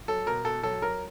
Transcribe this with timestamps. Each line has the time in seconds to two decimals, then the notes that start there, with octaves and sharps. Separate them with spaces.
0.08 F#3 A4
0.26 B2 A#4
0.45 B2 A4
0.63 F#3 A4
0.82 F#3 A#4